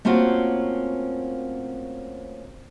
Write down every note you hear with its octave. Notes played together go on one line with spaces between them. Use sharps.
A3 A#3 C4 C#4 F4 F#4